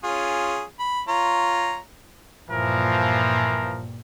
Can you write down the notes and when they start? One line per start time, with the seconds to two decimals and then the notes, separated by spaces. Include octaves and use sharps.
0.04 C#4 F4 G#4
0.80 B5
1.08 F4 C#5 A#5
2.50 G2 A#2 E3 F3 A#4